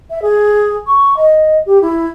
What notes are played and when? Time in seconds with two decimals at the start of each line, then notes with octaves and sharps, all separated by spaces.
0.10 E5
0.22 G#4
0.87 C#6
1.17 D#5
1.66 G4
1.82 E4